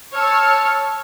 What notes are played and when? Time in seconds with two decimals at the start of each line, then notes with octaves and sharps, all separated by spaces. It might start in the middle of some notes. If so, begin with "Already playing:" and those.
0.15 C#5 A5 C#6 E6 F6